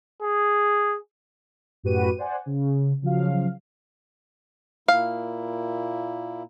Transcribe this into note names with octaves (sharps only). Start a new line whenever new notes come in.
G#4
F#2 A2 F#4 G4 B4 D#7
C5 D5 F#5 G#5
C#3
C#3 F3 F#3 F5
A#2 A#3 E4 F5